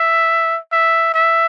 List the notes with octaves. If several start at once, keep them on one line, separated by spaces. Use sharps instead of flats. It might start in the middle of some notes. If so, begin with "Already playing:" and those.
Already playing: E5
E5
E5